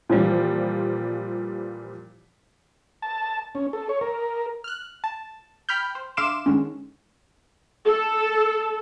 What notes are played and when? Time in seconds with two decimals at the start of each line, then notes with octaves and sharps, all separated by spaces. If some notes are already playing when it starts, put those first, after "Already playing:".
0.09 A#2 E3 F3 G3
3.02 A5
3.55 C#4
3.73 A4
3.89 C#5
4.01 A#4
4.64 F6 F#6
5.04 A5
5.69 G5 B5 F6 G6
5.95 C5
6.17 D3 E5 F5 C6 D6 E7
6.46 D3 D#3 G#3 C#4
7.86 A4